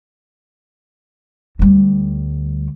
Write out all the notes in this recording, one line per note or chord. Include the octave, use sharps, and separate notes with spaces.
D2 G3